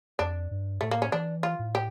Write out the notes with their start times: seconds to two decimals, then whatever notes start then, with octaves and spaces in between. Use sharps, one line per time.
0.19 F2 D4
0.51 G2
0.81 A2 A3
0.91 A#3
1.02 C#4
1.12 E3 D4
1.43 F4
1.59 A2
1.75 G4